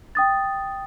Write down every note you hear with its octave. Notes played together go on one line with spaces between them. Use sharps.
G5 D#6 A6